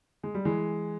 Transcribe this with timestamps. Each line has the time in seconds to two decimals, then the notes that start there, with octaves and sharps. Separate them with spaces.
0.23 G#3
0.34 G3
0.45 E3 G#3